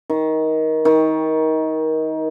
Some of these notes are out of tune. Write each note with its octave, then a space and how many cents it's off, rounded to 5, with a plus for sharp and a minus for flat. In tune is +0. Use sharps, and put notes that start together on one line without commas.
D#3 +20
D#3 +25